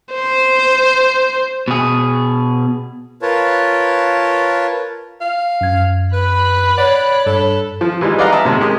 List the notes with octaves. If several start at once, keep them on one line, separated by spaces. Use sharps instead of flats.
C5
B2 G#4
F4 A#4 B4 C#5 A5
F5
F#2 G#6
B4 B5 F#6
C#5 D5 F#5
G2 A4
F3
E3 F3 G3 G#3 D#4
B4 D5 D#5 F5 F#5 A#5
E5 A5 A#5
A2 C3 G#3
G#3 G4 A#4 D#6